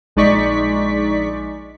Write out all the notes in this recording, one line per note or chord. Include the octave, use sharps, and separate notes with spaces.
A#1 G#3 D#4 D5 C#6 B6